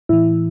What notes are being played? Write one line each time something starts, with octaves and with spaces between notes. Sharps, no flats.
A2 E3 E4